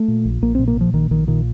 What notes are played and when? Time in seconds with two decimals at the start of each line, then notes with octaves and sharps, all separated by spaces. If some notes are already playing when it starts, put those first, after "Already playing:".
Already playing: A3
0.08 A#2
0.25 A#1
0.42 A#1 A#3
0.55 C4
0.59 A#2
0.68 A#3
0.77 A#2 F3
0.93 A#1 D#3
1.11 A#1 D#3
1.27 A#2 D#3